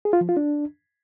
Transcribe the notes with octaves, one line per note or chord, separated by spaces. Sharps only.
G#4
F4
F3
F4
D4